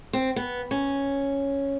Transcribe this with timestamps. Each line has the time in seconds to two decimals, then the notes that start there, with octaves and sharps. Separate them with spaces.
0.13 C4
0.36 B3
0.71 C#4